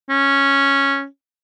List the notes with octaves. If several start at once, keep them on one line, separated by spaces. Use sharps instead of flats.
C#4